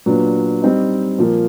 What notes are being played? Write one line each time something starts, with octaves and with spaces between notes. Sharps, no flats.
A#2 F#3 B3 D4
G3 C4 D#4
A#2 F3 A#3